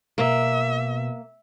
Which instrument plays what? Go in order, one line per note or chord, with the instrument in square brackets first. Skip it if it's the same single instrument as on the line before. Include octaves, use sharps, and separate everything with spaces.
[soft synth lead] B2 [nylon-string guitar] A#3 [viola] E5